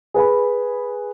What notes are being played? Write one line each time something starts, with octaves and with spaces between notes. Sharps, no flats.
G#4 B4 G#5 B5